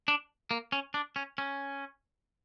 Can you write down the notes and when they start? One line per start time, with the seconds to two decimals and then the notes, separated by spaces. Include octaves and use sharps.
0.08 D4
0.51 A#3
0.72 C#4
0.94 D4
1.16 C#4
1.38 C#4